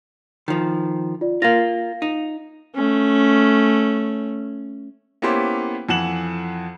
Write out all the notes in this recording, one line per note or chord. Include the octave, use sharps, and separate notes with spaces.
D#3 F3
F4 D5
A#3 F4 F5 A#6
D#4
A3 C#4
A#3 B3 C#4 E4 G4 C5
F2 E3 F#5 E7 F#7